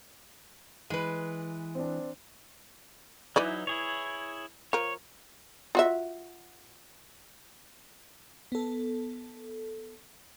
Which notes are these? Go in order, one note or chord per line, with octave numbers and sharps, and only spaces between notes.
E3 G#3 B4
C4 D4
E3 F#3 D#4 E4 B4 D5
E4 G#4 C#5
F3 A#4 C#5
F4 F#4 E5
B3 A4